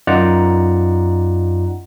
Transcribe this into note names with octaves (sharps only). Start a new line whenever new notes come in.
F#2 D#4 F4 D5 F#5 A#5